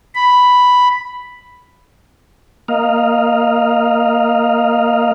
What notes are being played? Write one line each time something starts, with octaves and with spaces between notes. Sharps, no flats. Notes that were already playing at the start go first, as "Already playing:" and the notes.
B5
A#3 D#5 F5